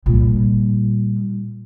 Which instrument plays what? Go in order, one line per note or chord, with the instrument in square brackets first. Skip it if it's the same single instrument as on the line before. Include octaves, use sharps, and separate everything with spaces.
[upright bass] A#2 G3